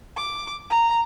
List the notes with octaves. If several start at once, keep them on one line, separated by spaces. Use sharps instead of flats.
D6
A#5